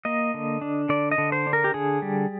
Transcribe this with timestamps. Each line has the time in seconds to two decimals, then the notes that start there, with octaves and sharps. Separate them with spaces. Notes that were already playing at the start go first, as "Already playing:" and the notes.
0.05 A#3 D#5
0.34 D3
0.61 D4
0.89 D3 D5
1.11 D#5
1.18 D3
1.32 C5
1.47 D4
1.53 A#4
1.64 G4
1.74 D3 G#4
2.02 G3